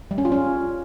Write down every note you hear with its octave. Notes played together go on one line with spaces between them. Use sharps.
G3
C#4
F4
C#4